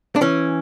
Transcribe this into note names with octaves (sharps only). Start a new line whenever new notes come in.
D4
E3 C#4